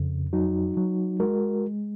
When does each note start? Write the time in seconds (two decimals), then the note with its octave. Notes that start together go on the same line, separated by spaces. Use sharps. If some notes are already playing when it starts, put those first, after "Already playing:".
Already playing: F2 C#3
0.33 F#3 D#4 F#4
0.77 F#3
1.20 G#3 F#4 A#4